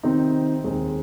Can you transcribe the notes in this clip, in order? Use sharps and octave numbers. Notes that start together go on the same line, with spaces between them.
C3 D#3 C4 D#4
D#2 D#3 G#3 C4